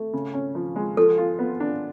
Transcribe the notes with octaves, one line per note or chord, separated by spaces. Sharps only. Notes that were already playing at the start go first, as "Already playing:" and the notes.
Already playing: A3
C#3
C#4
F3
G#3
F3 A4
F4
B3
D4